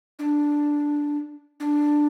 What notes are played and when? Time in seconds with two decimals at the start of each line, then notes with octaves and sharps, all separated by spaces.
0.19 D4
1.60 D4